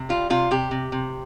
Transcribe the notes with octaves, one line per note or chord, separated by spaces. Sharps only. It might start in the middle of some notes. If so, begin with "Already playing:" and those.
Already playing: C3
G3 F4
C3 F4
C3 G4
C3
C3